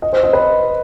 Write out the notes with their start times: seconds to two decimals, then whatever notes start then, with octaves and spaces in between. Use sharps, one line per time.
0.02 D#5
0.13 C5
0.23 D#5
0.33 B4